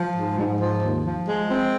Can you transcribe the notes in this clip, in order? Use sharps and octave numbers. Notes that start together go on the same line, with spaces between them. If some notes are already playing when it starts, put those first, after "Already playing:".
Already playing: F3
G#2
G#2
F3
D#2
F3
G#3
C4